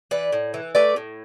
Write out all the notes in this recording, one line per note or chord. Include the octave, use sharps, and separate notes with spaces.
E3 B4 D5
A2
E3
A3 B4 D5
A2